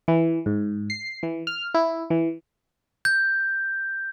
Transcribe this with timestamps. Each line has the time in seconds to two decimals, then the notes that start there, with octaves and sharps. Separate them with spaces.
0.08 E3
0.46 G#2
0.90 C7
1.23 E3
1.47 F6
1.74 E4
2.10 E3
3.05 G6